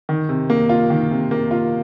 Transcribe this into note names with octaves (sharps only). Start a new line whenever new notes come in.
D#3
C3
A#3
F4
D#3
C3
A#3
F4